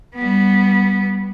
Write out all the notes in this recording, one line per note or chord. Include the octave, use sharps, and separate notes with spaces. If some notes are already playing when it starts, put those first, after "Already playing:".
G3 B3